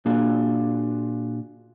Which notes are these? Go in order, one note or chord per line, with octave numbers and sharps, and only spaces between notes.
A#2 A#3 D4 F4 F#4 G#4